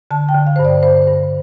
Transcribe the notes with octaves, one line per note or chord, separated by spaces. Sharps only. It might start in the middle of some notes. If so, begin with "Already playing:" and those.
D3 A5
G5
D3
F5
G2 C5
D5
G2 C5
G2